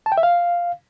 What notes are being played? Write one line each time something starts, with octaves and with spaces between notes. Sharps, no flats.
A5
G5
E5
F5